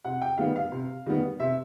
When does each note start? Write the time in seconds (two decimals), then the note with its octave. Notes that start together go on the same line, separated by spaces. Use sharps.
0.04 C3 F#5
0.22 G5
0.38 D#3 G3 B3 F5
0.56 F5
0.72 C3
1.06 D#3 G3 B3
1.40 C3 E5